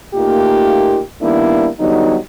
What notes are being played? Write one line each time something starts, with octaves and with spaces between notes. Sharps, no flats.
A#2 A3 A#3 D#4 F4 G4
D#3 G3 A#3 B3 D4 E4
D3 F#3 G3 B3 D#4